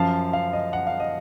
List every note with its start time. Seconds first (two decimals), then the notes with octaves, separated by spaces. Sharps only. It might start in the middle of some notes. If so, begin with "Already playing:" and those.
Already playing: F#2 F3 F5 A5
0.33 F5
0.53 D#5
0.73 F#5
0.87 F5
1.00 D#5